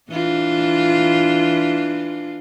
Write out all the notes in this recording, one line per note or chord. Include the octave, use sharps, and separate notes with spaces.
E3 D4 F4